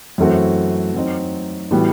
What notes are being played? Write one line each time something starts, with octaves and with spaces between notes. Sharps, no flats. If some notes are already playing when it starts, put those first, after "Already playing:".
F#2 E3 A3 C4 F#4
F#3 C4 D#4
A2 E3 G3 B3 F#4